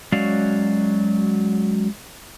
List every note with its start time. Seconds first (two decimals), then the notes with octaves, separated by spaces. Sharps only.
0.12 F#3 G#3 C#4 F#4 D5 F5